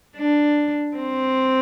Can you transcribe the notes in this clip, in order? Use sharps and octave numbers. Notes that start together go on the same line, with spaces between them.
D4
C4